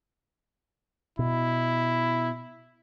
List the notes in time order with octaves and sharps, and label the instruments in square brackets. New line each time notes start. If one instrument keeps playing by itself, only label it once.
[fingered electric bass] B2 [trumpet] E4